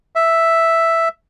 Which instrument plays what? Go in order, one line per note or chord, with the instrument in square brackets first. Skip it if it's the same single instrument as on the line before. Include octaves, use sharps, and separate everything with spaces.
[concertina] E5